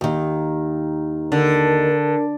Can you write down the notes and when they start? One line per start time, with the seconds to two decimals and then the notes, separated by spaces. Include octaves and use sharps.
0.01 D#2 D#3
1.32 D3 A#4